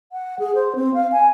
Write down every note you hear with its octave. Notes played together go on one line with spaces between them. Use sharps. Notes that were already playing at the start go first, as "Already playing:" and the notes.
F#5
G#4
C5
C4
F5
G#5